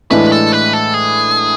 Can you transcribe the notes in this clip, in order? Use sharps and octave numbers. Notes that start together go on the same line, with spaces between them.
A2 E3 G#3 D4 B4
A4
B4
A4
G#4